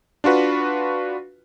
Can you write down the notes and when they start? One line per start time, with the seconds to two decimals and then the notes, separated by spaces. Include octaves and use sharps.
0.24 D4 F4 F#4 B4